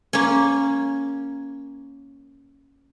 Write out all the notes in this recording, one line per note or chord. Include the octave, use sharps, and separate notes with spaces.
A#3 C#4